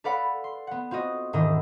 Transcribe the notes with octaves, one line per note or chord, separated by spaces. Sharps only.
A4 B4 D5 F5 F#5 B5
C6
B3 F#5
C4 F4 F#4 D#5
E1 G#2 D#3 E4 D#5 E6